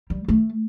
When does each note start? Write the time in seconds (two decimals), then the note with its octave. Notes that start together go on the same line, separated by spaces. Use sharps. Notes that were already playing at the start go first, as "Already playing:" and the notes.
0.10 G3
0.28 A3